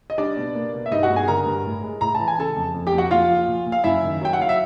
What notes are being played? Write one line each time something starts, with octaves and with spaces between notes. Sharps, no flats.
D#5
G3 D4 D5
B2
A#3
B2
E5
G2 D#4 D#5
F#4 F#5
G2
G#4 G#5
D3 A#4 A#5
G2
A2
G#3
A2 A#5
E3 A5
G#5
C#3 A4 A5
F2
F2
G4 G5
F2
F#4 F#5
A#2 F4 F5
F3
A#2
A#2
F5
F#2 E4 E5
D#3
F#3 G5
F#5
F#3 F5
E5